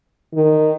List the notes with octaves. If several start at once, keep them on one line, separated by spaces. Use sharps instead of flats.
D#3